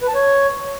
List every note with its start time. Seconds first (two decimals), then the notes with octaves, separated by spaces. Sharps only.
0.01 B4
0.08 A5
0.15 C#5